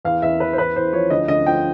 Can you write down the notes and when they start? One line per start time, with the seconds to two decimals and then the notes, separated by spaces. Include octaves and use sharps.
0.05 E2 F5
0.22 E2 E5
0.40 E3 B4
0.53 C5
0.58 E2 B4
0.76 E2 C5
0.93 F3 C#5
1.10 D2 D#5
1.28 D2 D#5
1.47 F3 G5